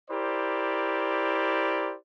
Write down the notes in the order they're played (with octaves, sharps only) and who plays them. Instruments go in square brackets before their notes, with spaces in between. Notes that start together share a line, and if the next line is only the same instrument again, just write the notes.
[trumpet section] E4 G4 A#4 C5 D5